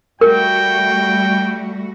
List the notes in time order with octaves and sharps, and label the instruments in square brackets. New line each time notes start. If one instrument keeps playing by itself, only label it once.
[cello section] G3 A3 F#4 [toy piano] A#4 [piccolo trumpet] G5